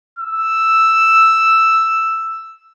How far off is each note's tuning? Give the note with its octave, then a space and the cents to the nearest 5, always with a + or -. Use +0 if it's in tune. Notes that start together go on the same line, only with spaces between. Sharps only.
E6 +0